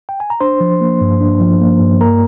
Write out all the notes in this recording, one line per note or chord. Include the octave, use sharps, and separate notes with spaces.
G5
G#5
A#5
D4 C5 C6
F3
A#3
G2
D4
F3
A#3
G2
A#3 A#4 A#5